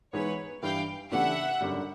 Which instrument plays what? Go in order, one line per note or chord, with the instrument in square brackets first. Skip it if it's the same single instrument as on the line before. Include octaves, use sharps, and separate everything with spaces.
[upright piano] E3 G#3 B3 D#4 G#4 [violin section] B4 C#5
[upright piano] G2 E3 G3 [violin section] F5 G5
[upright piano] C#3 E3 A3 D4 G4 [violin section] E5 F#5
[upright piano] G#1 F#2 D3 G3